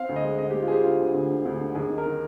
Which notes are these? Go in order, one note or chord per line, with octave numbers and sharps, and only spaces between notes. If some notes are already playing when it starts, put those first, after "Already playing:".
Already playing: C4 F5
D2
D#5
G#3
D3 D#5
G4
G#3
F4
C4 G4 G#4
D3 F4
D3
D2
D3
D2
D3
D#2 G#4
D#3
A#4
D#3